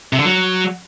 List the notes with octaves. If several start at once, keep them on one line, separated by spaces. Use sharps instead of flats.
C3
D3
F#3